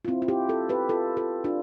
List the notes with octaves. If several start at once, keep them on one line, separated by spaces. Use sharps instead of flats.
F4
C4 E4
F4
E4 G4
F4 A4
G4 B4
F4 A4
F4 A4
D4 F4